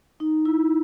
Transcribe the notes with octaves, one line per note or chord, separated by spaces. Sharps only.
D#4
E4